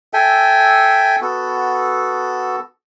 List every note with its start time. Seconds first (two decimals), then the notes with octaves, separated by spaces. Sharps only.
0.14 A4 E5 G5 G#5
1.21 B3 F#4 A4